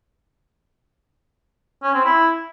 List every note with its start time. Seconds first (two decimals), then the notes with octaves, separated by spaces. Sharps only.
1.83 C#4
1.94 C4
2.05 E4